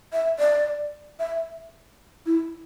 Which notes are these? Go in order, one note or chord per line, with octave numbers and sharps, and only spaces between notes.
E5
D5
E5
E4